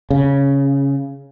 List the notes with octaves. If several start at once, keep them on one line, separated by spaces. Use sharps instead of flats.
C#3